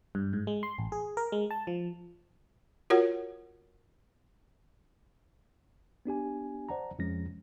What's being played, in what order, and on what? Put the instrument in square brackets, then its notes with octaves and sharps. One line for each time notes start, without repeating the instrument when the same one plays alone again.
[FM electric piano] G2
G#2
G#3
C6
A1
G#4
A#4
G#3
A5
F3
[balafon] F4 F#4 A#4 C#5 F#5
[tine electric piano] B3 D4 G4 G#5
C5 D5 F#5 A5 A#5
F2 F3 G#3 C#4 A#6